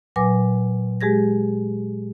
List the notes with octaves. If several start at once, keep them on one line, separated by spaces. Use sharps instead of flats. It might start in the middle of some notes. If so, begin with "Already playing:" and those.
A#2 F#3 B4 G#5 D6 A#6
G#3 G4 G#4 G#6 A#6